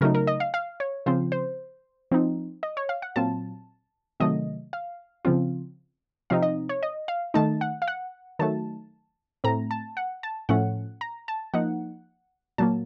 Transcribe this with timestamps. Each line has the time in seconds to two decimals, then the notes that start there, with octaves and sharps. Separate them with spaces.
0.01 C#3 F#3 A3 D#4 A#4
0.15 A#4
0.27 D#5
0.40 F5
0.54 F5
0.80 C#5
1.06 C#3 F3 C4 F4 C5
1.32 C5
2.11 F3 C4 D#4
2.63 D#5
2.77 C#5
2.89 F5
3.02 F#5
3.16 A#2 F#3 C4 F4 A5
4.20 C3 D#3 F#3 A3 D#5
4.73 F5
5.25 C#3 F3 C4 F4
6.30 C3 F3 C4 D#4 F5
6.42 D#5
6.69 C#5
6.83 D#5
7.08 F5
7.34 D#3 A3 D#4 A5
7.61 F#5
7.82 F5
7.88 F#5
8.39 D#3 F#3 A3 A5
9.44 A2 A3 C4 A#5
9.71 A5
9.97 F#5
10.23 A5
10.49 A2 F3 A3 C#4 F#5
11.01 A#5
11.28 A5
11.54 F3 A#3 D#4 F#5
12.58 A#2 F#3 A#3 A5